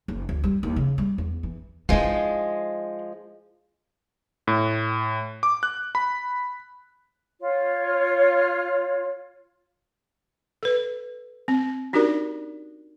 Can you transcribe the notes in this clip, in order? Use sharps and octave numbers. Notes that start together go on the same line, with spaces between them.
F#1
D2
G3
D#2
C#3
G3
E2
E3
F3 G#3 D4 D#4
A2
D6
F#6
B5
F4 C#5
A4 B4
C4
D4 D#4 F#4 G4 A#4 D5